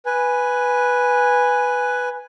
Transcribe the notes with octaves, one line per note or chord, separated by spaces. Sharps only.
B4 G#5